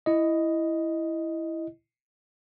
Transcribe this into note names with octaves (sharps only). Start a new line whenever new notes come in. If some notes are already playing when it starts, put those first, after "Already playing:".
E4 D#5